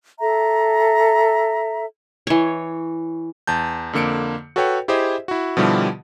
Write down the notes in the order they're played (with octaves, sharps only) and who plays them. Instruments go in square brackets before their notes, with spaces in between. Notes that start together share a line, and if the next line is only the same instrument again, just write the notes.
[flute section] A4 E5 A#5
[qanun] E3 C#5
[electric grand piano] E2 A5 G6
F2 D3 A#3 C#7 D7
F#4 A4 B4 C#5 G5
E4 G4 G#4 C5 D#5 E5
E4 F#4
B2 D3 F3 G3 E4 G4